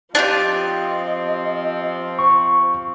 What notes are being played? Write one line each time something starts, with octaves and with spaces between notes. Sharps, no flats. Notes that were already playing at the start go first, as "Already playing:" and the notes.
F3 C4 D4 F4 G4 D#5
C5 C#6